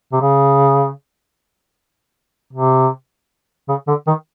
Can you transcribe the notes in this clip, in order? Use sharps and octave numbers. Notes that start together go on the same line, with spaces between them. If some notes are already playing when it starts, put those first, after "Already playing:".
C3
C#3
C3
C#3
D3
D#3